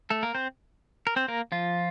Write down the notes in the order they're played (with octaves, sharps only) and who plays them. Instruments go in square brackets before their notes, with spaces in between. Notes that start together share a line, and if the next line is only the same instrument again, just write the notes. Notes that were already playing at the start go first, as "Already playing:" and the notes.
[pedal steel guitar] A3 A4
A#3 A#4
C4 C5
A#4
C4 C5
A#3 A#4
F3 F4